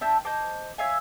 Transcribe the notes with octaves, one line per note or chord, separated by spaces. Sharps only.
D4 E5 G5 A5
C5 D#5 A5 D6
C#5 E5 F5 G#5